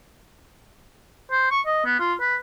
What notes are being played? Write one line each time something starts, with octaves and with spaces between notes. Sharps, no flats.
C5
C#6
D#5
B3
F4
B4